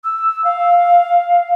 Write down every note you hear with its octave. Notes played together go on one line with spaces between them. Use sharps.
E6
F5